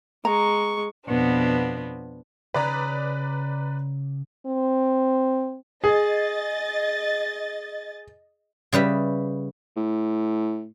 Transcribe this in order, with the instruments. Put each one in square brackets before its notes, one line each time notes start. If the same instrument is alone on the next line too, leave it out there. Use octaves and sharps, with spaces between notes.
[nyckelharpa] G#3 C#6 [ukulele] A#5
[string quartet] F2 B2 B3 C4 D4
[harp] C#3 [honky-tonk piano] B4 D5 A#5
[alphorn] C4
[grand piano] G#4 [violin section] D#5 A6
[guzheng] C#3 G3 B4 E5
[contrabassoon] A2